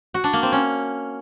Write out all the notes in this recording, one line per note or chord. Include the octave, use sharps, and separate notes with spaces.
F#4
D4
A#3
C4
C#4